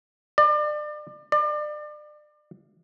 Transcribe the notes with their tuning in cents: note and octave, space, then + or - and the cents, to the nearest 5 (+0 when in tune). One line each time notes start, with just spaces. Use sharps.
D5 +35
D5 +35